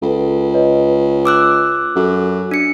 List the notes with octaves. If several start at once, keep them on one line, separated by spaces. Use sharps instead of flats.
C#2 A4 B4
B4 C#5 D#5
D6 E6 F#6
F#2 A4
D4 C#7